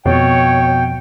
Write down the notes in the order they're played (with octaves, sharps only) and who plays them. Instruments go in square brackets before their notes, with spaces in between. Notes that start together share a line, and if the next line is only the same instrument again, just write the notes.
[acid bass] F2 [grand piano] B2 [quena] C#5 [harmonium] G5